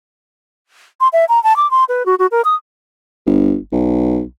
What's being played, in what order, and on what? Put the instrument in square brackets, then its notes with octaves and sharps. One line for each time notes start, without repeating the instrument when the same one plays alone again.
[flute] C6
E5
A#5
A5
D6
C6
B4
F#4
F#4
A#4
D#6
[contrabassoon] G1
B1